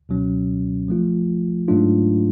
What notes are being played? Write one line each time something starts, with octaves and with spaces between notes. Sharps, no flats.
C#2 B2 F#3 C#4
F3 A3 F4
G#2 F#3 A3 D4 F4